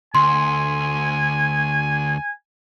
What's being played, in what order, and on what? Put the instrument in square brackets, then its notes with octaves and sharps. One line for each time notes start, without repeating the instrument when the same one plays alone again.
[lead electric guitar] D2 [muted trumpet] G#5 [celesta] C6